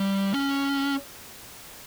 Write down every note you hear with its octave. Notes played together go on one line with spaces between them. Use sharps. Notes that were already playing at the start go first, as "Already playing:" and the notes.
Already playing: G3
C#4